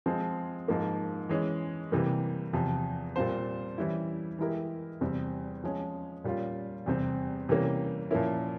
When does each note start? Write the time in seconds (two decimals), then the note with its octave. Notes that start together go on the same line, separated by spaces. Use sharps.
0.06 F3 G#3 C4
0.68 G#2 F3 A#3
1.29 E3 G#3 C#4
1.92 C3 E3 G3 A#3
2.53 E2 C3 F3
3.16 A#2 G3 C4 F4 C5
3.78 E3 G3 C#4 E4
4.39 E3 G#3 E4 G4 A#4
5.01 E2 C3 G3 C4
5.64 F3 G#3 C#4
6.24 A#2 G3 C#4 F4
6.86 E2 C3 G3 C4
7.49 C3 E3 G3 A#3 C#4
8.11 A#2 F3 A#3 C#4 E4